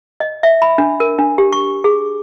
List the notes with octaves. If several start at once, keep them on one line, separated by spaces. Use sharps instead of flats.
D#5
E5
B5
D4
A#4
D4
G4
C#6
G#4